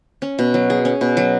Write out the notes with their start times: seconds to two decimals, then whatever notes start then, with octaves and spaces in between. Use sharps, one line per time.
0.22 C#4
0.39 B2
0.54 F#3
0.70 G#4
0.85 C#4
1.01 B2
1.17 F#3